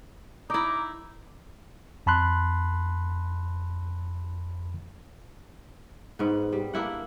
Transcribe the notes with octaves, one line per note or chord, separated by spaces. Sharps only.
D#4 E4 A#5 D6
F2 A5 B5 C6 F#6
G#2 B3
G3
A#3 D4 E4 F#5